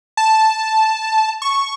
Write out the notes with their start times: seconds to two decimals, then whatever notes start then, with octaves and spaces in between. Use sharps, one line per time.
0.17 A5
1.42 C#6